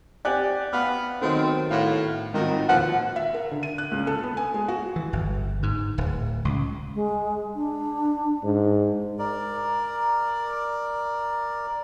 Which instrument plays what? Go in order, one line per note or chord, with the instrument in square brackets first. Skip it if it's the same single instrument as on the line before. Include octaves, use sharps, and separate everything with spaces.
[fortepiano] C4 G4 F#5 [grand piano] D5 G#5 F#6
[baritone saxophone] B3 [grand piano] F5 B5 F6
[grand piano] D#3 F#3 B3 [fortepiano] A3 D#5 [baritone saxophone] C4
[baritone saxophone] A2 [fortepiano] F5 F#5
[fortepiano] G#2 F4 F#4 [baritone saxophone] D#3 [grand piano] C4 D#4
[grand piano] D#2 A#2 [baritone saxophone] F3 [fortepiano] B4 [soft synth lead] F#5
[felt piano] E5
A#4
D3
D#7
F#6
C#2
A4
B3
G#5
G#3
F#4
[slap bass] E3
G1
G#2
D1
C#2
[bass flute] G#3
D4
[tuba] G#2
[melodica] A#4 D5